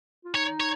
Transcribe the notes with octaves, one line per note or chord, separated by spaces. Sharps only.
F4
D#4 C#5
C#5